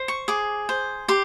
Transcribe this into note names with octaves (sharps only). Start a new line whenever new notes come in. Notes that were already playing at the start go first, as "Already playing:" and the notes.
Already playing: C5
C#6
G#4 D6
C5
G4 C6